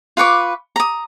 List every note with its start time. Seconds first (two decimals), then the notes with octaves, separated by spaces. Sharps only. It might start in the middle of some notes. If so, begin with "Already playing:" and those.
0.17 F4 B4 C#6 D6
0.76 A#5 D#6